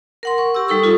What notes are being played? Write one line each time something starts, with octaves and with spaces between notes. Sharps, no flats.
A#4 F#5 C6
C#6
G4 E6
G3 D#4 A4 C#6
F4 A4 C#6